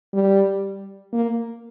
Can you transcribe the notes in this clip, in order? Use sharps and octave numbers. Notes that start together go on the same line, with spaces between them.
G3
A#3